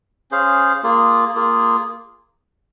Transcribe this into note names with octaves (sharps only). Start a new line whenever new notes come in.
C#4 G#4 C5 F5
A#3 F4 G#4
A#3 F4 G#4